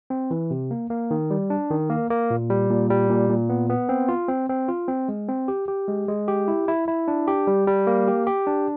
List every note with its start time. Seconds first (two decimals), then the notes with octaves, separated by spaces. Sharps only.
0.10 C4
0.31 E3
0.51 C3
0.71 A#3
0.90 A#3
1.11 D#3
1.30 G3
1.50 D4
1.70 D#3
1.90 A#3
2.10 A#3
2.30 A#2
2.50 G3
2.70 A#2
2.90 G3
3.10 A#2
3.30 A#2
3.49 B3
3.70 B3
3.89 C4
4.09 F4
4.28 C4
4.49 C4
4.68 F4
4.88 C4
5.08 G#3
5.29 C4
5.48 G4
5.68 G4
5.88 G#3
6.08 G#3
6.28 G4
6.48 E4
6.68 E4
6.88 E4
7.08 D4
7.28 G4
7.47 G3
7.67 G3
7.87 A#3
8.08 G4
8.27 G4
8.47 D4